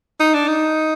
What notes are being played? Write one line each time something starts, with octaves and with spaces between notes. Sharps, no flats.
D#4
D4
D#4